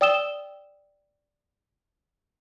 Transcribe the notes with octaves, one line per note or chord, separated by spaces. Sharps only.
D5 G5 D#6 E6 E7 G7